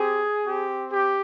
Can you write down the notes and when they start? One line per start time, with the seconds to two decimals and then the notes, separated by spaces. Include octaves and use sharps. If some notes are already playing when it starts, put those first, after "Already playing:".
Already playing: C4 G4 G#4
0.45 C4 G4
0.91 G4